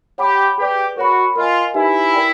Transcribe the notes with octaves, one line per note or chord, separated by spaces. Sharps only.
G4 C#5 F#5 B5 D6
G4 G#4 B4 D5
F#4 A#4 C#5 F#5 B5
F4 A#4 D#5 G#5
D#4 E4 G4 B4 E5 G#5
A#4 D5 G5